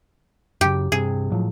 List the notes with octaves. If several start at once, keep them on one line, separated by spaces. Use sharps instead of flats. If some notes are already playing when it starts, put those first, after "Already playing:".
F#2 C#3 G4
G2 C3 G#4
A2 F3 F#3